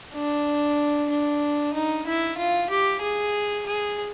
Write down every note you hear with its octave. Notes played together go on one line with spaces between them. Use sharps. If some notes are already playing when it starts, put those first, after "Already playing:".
D4
D4
D#4
E4
F4
G4
G#4
G#4